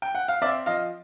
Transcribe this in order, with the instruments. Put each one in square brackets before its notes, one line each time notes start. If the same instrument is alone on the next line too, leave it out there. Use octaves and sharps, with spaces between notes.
[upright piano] G5
F#5
F5
C4 D5 E5
F3 D#5 F5